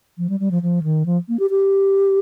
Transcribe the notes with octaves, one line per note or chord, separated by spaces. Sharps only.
F3
G3
G3
F3
F3
D#3
F3
A#3
G4
G4